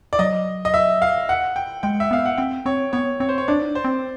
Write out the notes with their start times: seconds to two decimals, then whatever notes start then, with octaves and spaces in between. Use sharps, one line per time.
0.13 D5
0.19 F#3 D#5
0.65 D#5
0.74 E5
1.02 F5
1.29 F#5
1.56 G5
1.83 G#3 G5
2.00 E5
2.11 B3 F5
2.26 F#5
2.38 C4 G5
2.66 C4 C#5
2.93 B3 C#5
3.20 C4 C#5
3.29 C5
3.38 C#5
3.48 D4 D5
3.62 D#4
3.66 D4
3.75 C5
3.84 C4